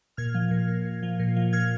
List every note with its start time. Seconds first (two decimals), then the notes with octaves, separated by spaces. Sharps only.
0.17 A#2 F6 G#6
0.35 F3
0.51 A#2
0.68 A#2
0.85 A#2
1.03 F3
1.20 A#2
1.36 F3
1.53 A#2 F6 G#6